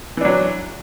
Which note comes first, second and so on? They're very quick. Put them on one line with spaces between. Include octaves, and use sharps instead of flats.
E3 D4 F#3